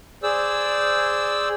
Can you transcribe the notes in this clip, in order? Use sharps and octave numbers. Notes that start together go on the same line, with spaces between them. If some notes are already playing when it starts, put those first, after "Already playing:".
G#4 C5 D5 E6